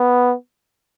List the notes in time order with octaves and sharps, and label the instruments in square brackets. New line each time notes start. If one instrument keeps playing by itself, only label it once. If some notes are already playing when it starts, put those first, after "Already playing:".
Already playing: [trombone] B3